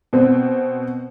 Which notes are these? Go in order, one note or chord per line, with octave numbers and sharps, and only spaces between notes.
B2 C4